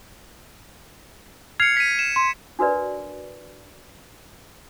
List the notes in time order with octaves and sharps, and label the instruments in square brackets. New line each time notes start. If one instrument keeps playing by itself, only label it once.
[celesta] F6 C7 F7 [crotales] G#6 C#7
[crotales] B6 D#7
E7
[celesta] C6
[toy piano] D4 F#4 A#4 B4 D5